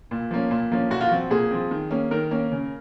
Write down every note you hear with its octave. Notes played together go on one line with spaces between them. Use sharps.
A#2
F3 A#3 C#4
A#2
F3 A#3 C#4
A#2 F#4
F4
F3 C4 F#4
A#2 G#4
F3 C4
D#3
A#3 C#4
D#3 A#4
A#3 C#4
C#3